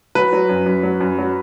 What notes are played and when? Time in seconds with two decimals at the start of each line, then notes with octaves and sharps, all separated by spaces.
0.15 F#3 B4
0.33 F#3
0.49 F#2
0.66 F#2
0.83 F#3
1.00 F#2
1.18 F#3